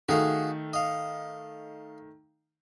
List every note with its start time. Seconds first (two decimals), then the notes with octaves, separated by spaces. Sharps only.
0.09 D#3 A3 F#4 G#4 F5
0.73 D#5 F5